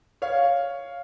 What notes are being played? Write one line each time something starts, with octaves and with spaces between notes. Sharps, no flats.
C#5 F5